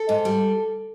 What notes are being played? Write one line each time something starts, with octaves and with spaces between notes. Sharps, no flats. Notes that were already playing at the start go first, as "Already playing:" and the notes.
Already playing: A4
G#2
G3